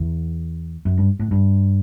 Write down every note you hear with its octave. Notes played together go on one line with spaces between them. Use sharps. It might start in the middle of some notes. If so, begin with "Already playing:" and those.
Already playing: E2
F#2
G2
A2
G2